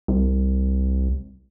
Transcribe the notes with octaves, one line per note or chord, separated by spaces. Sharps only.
C2